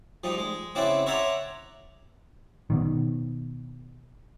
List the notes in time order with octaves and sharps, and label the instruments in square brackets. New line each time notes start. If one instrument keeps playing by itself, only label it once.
[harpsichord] F3 G3 D#4
G#3
C#3 C4 E4 D5 F#5
C#5 D5 E5 F#5 A#5 C6
[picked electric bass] B2 D#3